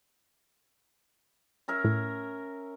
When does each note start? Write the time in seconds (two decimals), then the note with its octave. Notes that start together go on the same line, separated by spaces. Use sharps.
1.68 C#4 A#4 E5
1.85 A2